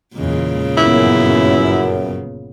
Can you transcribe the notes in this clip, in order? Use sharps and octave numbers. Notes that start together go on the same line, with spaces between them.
E2 A#2 C#3 E3 G#3
G1 F#2 B3 E4